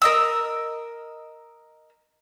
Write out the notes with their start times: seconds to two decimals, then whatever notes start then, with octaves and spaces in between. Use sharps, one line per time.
0.02 A#4 D#5 E6